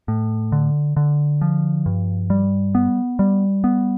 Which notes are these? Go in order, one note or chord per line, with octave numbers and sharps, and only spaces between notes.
A2
D3
D3
F3
G2
G3
B3
G3
B3